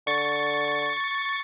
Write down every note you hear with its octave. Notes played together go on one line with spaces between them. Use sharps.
D3 C#6 A6